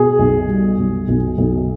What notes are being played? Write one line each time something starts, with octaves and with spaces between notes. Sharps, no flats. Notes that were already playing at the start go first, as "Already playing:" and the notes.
Already playing: B2 G#4
B1
G3
B1
B1
B1